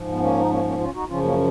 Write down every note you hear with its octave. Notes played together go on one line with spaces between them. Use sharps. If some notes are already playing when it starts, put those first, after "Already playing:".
Already playing: G#2 F3
B3
A#3 C#4
D#4
A#3 C#4
A#3 C#4
C#4 F4
D#4 F#4
F#2 C#3 F3 C#4 F4
A#3 C#4